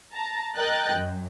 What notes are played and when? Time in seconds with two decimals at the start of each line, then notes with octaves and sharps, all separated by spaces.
0.13 A5 A#5
0.57 A#4 D#5 G5 F#6 G6 A6
0.94 F#2